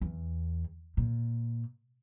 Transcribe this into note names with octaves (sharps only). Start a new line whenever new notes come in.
E2
A#2